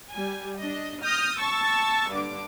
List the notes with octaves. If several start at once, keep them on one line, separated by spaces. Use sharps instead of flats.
G3 G#5
D4 D#5
D#6 F6 G6 A#6
A5 C#6 E6 A6
G2 D3 D6